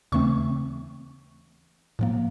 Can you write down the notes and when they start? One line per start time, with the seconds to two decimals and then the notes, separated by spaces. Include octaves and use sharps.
0.12 D#2 C#3 E3 A3 C4 C#6
1.99 A2 F3 A#3